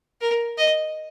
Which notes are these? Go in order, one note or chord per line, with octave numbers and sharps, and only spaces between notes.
A#4
D#5